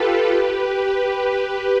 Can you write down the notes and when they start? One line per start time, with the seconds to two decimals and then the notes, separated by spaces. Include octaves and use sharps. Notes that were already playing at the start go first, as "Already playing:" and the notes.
Already playing: F4 G4 A4 B4
0.28 G4 B4
0.60 G4 B4